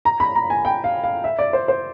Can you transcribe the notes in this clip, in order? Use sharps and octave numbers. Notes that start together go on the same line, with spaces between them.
A#5
B5
A#5
G#5
G5
F5
F5
E5
D5
C5
C5